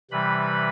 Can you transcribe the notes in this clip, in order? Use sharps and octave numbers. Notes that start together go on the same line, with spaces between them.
C3 E3 G3 B4 B5